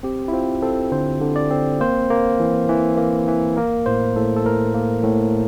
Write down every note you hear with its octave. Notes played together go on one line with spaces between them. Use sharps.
C4 G4
E4
C4 F4
C4 A4
D3 C5
D3
D5
C4
A#3 C5
A#3
E3
E3
A#3
E3
A#3 A#4
A2 C5
A2 A4
A4
A2 A#4
A#3
A2